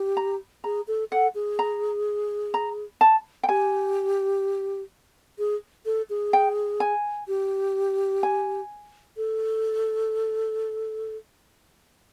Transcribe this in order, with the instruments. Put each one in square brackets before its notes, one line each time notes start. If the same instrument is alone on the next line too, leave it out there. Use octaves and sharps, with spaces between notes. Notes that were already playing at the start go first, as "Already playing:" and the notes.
Already playing: [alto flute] G4
[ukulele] A#5
[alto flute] G#4 [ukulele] A#5
[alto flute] A4
[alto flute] A4 [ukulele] F#5
[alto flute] G#4
[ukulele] A#5
A#5
A5
G5
[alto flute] G4 [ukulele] G#5
[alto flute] G#4
A4
G#4
[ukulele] G5
G#5
[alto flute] G4
[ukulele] G#5
[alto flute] A4